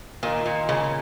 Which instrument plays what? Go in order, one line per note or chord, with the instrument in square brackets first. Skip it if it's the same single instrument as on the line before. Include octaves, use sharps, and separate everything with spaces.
[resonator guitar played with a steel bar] A#2 [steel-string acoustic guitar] D#3
[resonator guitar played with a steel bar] A#2
[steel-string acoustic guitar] C#3 [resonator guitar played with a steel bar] G#3